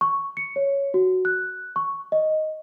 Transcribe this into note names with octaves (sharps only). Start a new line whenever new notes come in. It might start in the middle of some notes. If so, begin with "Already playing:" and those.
C#6
C#7
C#5
F#4
F#6
C#6
D#5